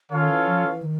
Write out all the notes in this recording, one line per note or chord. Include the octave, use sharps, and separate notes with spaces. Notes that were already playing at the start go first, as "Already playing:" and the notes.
D#3 C#4 F4 A4 C#5 F5
E3
F3
E3
D#3